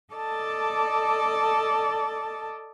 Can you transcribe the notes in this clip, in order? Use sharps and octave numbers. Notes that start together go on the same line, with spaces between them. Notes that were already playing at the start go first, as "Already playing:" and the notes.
A4 D5 D#5 A5